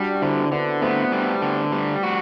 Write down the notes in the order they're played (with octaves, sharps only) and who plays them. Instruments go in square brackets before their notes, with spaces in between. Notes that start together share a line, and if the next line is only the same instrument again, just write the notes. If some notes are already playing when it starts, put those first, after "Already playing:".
Already playing: [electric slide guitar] G3 [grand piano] D4 F#4
[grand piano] F#4
[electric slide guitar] D3 [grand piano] C4 E4
[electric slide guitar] D3 [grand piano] B3 D4
[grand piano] A3 C4 [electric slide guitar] B3
[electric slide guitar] G3
D3
G3
F#4